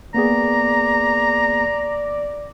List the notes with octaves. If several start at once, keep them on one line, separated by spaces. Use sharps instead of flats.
A#3 B3 G#4 D5 A#5